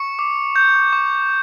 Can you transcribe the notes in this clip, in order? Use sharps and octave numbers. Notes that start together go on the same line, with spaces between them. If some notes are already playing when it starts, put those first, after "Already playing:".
Already playing: C#6 C#7
D6
G6
C#6